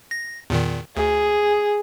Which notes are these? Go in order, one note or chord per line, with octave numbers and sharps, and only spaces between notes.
A#6
E2 A#2 D#3
D2 G#4